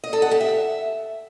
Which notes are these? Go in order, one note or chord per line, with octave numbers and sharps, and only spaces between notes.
D#5
A4
F#5
G4
E5